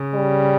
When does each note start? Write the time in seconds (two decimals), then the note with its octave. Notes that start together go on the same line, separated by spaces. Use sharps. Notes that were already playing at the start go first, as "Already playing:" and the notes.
Already playing: C#3
0.14 G3